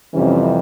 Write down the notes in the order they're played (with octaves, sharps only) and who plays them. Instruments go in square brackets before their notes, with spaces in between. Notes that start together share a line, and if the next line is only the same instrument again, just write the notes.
[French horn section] F2 C3 E3 G3 C#4